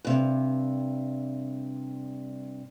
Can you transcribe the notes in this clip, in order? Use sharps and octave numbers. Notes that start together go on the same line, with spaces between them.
G2 C3